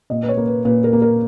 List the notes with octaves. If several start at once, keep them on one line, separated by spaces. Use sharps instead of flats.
A#2 D#5
B4
C#5
A#3
B4
A#2 B4
A#4
A#3
A#4